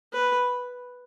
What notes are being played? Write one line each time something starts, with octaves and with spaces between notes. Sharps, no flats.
B4